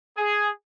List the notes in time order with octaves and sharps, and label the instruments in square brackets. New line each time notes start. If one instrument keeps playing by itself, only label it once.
[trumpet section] G#4